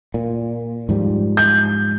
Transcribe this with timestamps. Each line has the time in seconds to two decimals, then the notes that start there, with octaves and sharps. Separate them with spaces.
0.14 A#2
0.89 G#2 F3 G3
1.37 G6